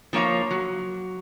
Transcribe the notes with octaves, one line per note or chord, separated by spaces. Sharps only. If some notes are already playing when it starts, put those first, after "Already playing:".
F3 A#3 C#5 F5 A#5
F#3